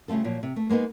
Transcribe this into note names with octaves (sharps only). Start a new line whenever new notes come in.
C#3 G3 A3 F4 A4
A#2 F3 F#3
C3
A3
G#3 A#3 B3 D#4